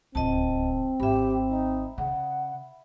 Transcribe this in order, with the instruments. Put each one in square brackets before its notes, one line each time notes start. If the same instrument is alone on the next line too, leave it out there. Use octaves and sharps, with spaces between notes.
[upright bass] D1 C#2 [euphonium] C4 [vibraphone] D#5 A5
[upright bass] G#1 [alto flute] G4 [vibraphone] E5 B5
[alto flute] D#4
[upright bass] C#3 [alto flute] F#5